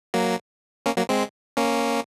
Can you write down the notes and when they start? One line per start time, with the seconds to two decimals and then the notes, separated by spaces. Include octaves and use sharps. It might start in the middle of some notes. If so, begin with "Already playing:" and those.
0.14 F#3 A#3
0.86 A#3 C#4
0.97 F#3 A#3
1.09 G#3 C4
1.57 A#3 C#4